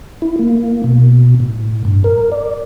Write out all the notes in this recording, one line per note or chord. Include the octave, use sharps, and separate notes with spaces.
E4
A#3
B2
A2
G2
A#4
D5